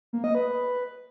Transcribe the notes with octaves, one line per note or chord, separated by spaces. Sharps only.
A#3
D#5
B4